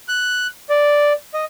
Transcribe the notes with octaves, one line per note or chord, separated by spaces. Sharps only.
F#6
D5
D#5